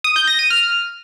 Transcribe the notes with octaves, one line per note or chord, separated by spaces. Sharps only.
D#6
G6
A#6
D#7
F6